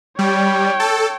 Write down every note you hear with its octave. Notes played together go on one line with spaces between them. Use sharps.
G3 C#5 G5
A4